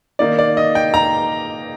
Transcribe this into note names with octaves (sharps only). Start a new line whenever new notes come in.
D#3 A#3 D#4 D5
D5
D#5
G5
A#5